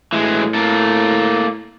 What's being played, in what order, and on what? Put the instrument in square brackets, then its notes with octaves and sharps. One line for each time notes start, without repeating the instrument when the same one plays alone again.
[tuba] A2 [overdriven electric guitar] E3 G#3
[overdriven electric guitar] A#3 A4